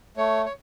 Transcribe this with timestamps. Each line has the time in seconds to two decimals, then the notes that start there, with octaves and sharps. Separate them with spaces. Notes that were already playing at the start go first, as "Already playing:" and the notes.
0.17 A3 C#5
0.46 C#5